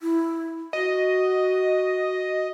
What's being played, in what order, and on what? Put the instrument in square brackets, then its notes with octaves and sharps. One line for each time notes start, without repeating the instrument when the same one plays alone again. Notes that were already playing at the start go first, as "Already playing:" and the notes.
[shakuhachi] E4
[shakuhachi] F#4 [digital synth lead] D#5